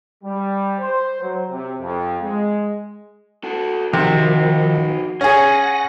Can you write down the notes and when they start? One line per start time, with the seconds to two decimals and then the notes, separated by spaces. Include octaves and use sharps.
0.23 G3
0.79 C5
1.21 F#3
1.49 C3
1.80 F2
2.21 G#3
3.44 F#4 A4
3.93 C3 D#3 F3 D#4 F#4
5.21 C#4 G#4 F#5 G#5 A#6